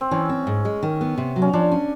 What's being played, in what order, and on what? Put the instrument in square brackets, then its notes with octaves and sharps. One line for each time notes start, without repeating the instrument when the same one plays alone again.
[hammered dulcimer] C4
[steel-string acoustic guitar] E3 [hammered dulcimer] C#4
[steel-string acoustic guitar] C4
G#2
G#3
D#3
B3
C3
F#3
[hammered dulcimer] C#4
[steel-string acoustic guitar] F3 [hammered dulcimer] D4
[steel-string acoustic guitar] C#4